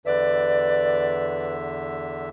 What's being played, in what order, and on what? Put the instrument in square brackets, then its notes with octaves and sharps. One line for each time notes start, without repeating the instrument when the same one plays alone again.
[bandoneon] E2 D3 E5 [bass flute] B4 [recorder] D5